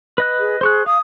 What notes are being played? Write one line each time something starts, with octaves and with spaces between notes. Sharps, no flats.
B4 D#5 F#6
G#4
G#4 C5 C#6 F#6
F5 D#6